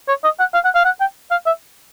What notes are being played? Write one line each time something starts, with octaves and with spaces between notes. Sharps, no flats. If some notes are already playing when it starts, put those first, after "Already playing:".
C#5
D#5
F#5
F5
F#5
F5
F#5
G5
F5
E5